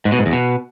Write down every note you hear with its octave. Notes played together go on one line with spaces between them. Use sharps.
G#2
B2
G#2
E2
B2